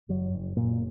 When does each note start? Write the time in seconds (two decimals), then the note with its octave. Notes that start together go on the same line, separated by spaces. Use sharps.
0.09 F#1 F#2 F#3
0.33 F#1
0.57 F#1 A#2 A#3